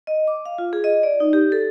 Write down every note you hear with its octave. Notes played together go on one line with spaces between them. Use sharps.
D#5
D6
F5
F4
G#4
D#5
D5
D#4
G4
A4